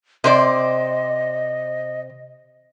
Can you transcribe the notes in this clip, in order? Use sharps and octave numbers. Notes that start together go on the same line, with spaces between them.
C3 C5 D5 D#5